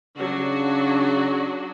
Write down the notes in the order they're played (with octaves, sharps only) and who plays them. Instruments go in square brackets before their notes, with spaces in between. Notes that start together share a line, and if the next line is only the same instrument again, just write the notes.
[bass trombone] C#3 [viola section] F#3 D4 F#4